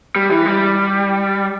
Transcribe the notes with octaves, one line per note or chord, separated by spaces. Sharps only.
G3
E3
G3